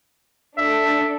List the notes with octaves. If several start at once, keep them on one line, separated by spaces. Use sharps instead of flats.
D4 A4 E5